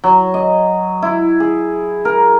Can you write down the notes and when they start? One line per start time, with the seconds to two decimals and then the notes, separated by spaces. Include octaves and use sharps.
0.04 F#3
0.34 D#5
1.02 E4
1.40 G#4
2.05 A#4